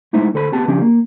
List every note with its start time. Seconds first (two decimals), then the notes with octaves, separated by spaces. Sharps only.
0.13 G#3 A3 D#4 E4 C5
0.34 D2 A4 C5 B5
0.52 B3 C4 G4 A5
0.68 C#3 F3 C#4 D4 G4
0.82 A#3